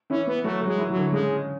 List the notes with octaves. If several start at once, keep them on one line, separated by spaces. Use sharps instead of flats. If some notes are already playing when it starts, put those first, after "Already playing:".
E3 C#4 E4
B3
F#3 A3 F#4
F#3 F#4
G#3
E3 E4
F#3
D3 D4
C#3 G#3 C#4